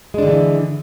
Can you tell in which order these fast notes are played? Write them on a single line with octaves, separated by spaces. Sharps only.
G#3 D4 D3 E3